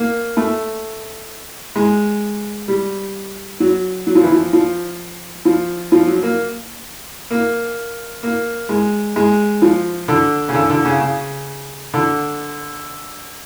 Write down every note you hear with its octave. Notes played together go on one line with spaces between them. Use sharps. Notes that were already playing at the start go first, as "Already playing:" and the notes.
Already playing: A#3
A3
G#3
G3
F#3
F#3
F3
E3
F3
F3
F3
F3
F#3
A#3
A#3
A#3
G#3
G#3
F3
D3
C#3
D3
D3
C#3
C#3
D3